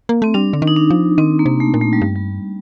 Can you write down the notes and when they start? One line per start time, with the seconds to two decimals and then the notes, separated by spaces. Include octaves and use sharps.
0.09 A#3
0.22 A3 C4
0.34 G3 D4
0.53 D3
0.62 D#3
0.67 D#4
0.76 D4
0.90 F3
1.18 D#3 C4
1.39 A#3
1.46 C3
1.60 A3
1.74 A#2
1.81 A3
1.93 G3
2.01 G2
2.16 G3